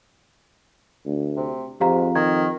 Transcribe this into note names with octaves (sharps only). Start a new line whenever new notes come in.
D2
C3
F2 G#2 G4 F5 A#5
D#3 G#6